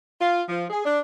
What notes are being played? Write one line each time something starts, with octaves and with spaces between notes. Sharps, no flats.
F4
F3
G#4
D4